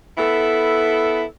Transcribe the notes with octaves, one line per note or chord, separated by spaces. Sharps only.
B3 E4 A4